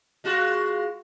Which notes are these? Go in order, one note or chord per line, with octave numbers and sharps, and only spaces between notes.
G#3 F4 F#4